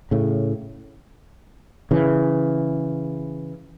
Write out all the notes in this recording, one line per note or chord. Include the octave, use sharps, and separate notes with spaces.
A2 C#3
C#3 E3